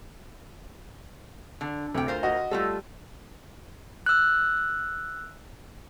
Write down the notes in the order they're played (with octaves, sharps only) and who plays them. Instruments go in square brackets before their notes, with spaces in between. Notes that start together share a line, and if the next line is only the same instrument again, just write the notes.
[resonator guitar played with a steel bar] D3
[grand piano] D2 [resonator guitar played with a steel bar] C3 G5
[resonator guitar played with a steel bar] F4 A#4 C5
[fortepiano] F#4 D#5
[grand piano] G3 [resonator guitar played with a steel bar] A3 F4 A4
[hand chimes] E6 F#6